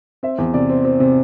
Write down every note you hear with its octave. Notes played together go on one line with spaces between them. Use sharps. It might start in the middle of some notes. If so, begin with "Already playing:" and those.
C4 E5
E2
C3 D5
C4
C4
C3